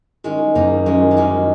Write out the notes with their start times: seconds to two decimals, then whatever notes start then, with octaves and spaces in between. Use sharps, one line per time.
0.24 D#3 G#3 C#4
0.40 D#3
0.55 F#1 A#3 D#4
0.71 D#3
0.86 F#2 G#3 C#4
1.01 D#3
1.11 A#3
1.17 D#3 G#3 C#4
1.33 D#3